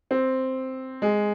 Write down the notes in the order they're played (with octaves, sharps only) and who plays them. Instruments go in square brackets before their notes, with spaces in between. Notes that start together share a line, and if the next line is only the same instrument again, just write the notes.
[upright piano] C4
G#3